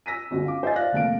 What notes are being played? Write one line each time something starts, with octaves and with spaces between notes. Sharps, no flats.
E6 A#6 B6 D#7
G1 C#2 F#4
F5 D6
C5 D#5 E5 G#5 A6
D5 F5 F#6 A#6
F1 D#2 F5 D7